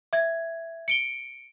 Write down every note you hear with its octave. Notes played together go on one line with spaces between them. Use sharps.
E5 G#6
C#7 D7 G7